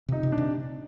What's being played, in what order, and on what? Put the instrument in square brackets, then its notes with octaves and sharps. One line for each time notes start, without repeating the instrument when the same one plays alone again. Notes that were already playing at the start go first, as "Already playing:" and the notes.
[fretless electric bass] C3 [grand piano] D#4
[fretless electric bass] C3
[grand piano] D4
[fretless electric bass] C3